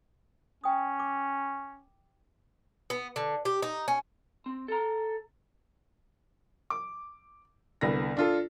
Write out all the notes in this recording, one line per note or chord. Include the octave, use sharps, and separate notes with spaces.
C#4 G5 D#6
D6
B3
D3
G4
D#4
C#4
C4
A4 A#5
D6
C2 D3 B3 A#6
D4 F4 A4